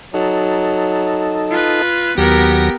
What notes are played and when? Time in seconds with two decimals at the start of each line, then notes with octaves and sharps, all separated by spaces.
0.14 F#3 D#4 A4
1.51 F4 B4
2.17 D#2 F#3 B3 G4 A#4 A#6